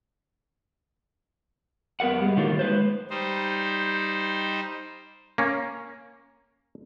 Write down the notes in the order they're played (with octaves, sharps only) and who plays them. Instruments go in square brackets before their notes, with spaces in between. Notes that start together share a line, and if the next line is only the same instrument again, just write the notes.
[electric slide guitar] F#2 B3 G#4 A#4 F#5
G3 G#3
A2 D3 D#3 F#3 A#3 F4
G#3 B4 C5
[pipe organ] G3 D#4 C5
[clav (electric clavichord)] A#3 C#4